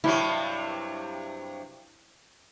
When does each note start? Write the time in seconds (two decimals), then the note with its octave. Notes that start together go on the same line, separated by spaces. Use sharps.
0.04 G2 C3 F#3 E4